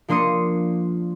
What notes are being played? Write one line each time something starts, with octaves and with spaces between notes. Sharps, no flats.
F3 A#3 D4 C6 D#6 C#7